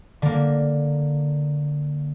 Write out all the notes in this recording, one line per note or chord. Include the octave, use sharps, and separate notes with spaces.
D3 A#3